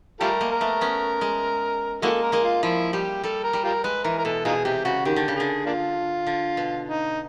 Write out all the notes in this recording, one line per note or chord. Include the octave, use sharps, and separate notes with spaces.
G3 A3 F4 G4 A#4
G#3 A#3
A#4
A3 B3
B3 C#4
G#3
G#3 A#3 E4 F#4 A4
A#4
G#3 A#3
F4
F3 E4
G3 G4
G3 A4
A#4
G3
F4 G4 A#4
G#3 B4
E3 A#4
A#4
B2 A4
B2 D#4 F4 G#4
C3 G4
C#3 F#4
D#3 G4
D3
C#3
D3 G#4
A#3 D4 F4
D3
B2
D#4